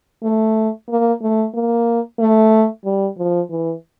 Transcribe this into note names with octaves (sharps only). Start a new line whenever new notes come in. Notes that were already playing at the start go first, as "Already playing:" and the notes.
A3
A#3
A3
A#3
A3
G3
F3
E3